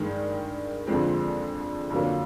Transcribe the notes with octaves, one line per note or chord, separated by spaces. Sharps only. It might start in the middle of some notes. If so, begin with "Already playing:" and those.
Already playing: G2 D#3 G#3
F2 D3 F3 G#3 C4
F2 D3 F#3 A#3